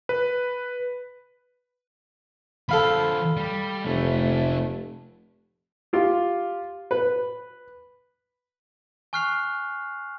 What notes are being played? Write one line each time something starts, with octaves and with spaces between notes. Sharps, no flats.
B4
D3 F3 A4 F5 B5
G3
F1 A3 C#4
F4 G4
B4
G#5 C#6 F6 F#6 C7 F7